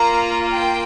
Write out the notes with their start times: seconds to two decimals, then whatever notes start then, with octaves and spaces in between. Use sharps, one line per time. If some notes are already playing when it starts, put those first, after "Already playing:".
Already playing: A#3 F4 A#5
0.52 G5